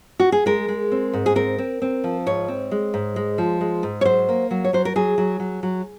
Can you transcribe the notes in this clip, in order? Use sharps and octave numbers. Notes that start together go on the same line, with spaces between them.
F#4
G#4
G#3 A#4
G#3
C4
G#2
G#4
C4 A#4
C4
C4
F3
G#2 C#5
C4
G#3
G#2
G#3
F3
G#3
G#2
C#5
F#3 C5
A#3
F#3
C#5
F#3 C5
A#4
F#3 G#4
F#3
F#3
F#3